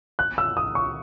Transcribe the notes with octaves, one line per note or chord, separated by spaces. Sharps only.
F#6
E6
D#6
C#6